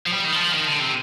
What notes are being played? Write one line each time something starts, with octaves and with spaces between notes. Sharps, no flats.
F3
G3
D#3
F3
D#3
D3
C3